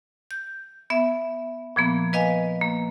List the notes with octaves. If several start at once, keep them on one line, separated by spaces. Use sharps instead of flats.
G6
B3 E5
A#2 F3 A#3 B3
B4 D#5 F5 G#5
A#3